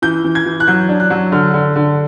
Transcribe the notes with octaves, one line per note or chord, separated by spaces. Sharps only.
E3 G6
E3
G#6
E3
F#6
F#3 G6
D4
F#6
F#3
D3 F6
D3
D3